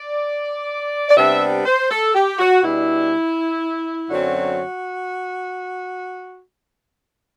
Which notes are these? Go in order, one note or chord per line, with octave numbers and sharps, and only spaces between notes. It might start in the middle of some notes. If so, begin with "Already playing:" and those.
Already playing: D5
D5
C3 G3 B3 D4 E5
C5
A4
G4
F#4
B2 G3 D4 E4
F#2 D3 F#3 C4 F#4